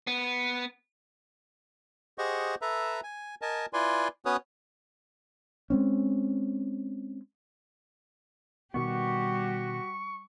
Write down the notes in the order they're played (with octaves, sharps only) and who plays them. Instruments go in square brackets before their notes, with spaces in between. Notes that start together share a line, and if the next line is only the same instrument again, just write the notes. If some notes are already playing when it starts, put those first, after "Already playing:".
[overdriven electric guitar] B3
[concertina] G4 G#4 C5 D#5 F#5 C#6
A4 B4 E5 A#5
G#5
A#4 D#5 G#5 A5
E4 F4 B4 D5 G#5 C6
B3 C#4 F#4 B4 C#5 D#6
[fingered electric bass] G#3 C4 C#4
[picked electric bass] B2 D#3 B3 [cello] G3 G4 [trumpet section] F#4 [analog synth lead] C#6